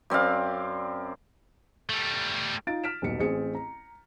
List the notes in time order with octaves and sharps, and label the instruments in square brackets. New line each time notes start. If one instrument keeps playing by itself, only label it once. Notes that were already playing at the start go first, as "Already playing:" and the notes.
[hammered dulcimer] F#2 C4 D5 F5
[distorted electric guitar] G3 A3
[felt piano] D#4 F4 A6 D7
F6 B6 D7 E7
D#1 B1 C#7
A1 C4 G#4 C#7
A#5